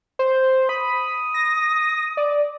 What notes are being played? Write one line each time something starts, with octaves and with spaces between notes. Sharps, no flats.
C5
B5 D#6
A#6
D5